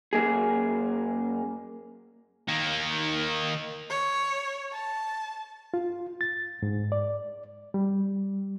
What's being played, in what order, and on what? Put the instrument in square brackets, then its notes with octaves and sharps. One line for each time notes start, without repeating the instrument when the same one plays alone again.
[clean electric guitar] F#2 A#3 G#4
[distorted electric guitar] D#3 A#3
[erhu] C#5
A5
[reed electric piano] F4
A6
G#2
D5
G3